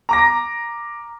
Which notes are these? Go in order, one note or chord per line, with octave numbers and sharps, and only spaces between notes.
A#5 D6 A#6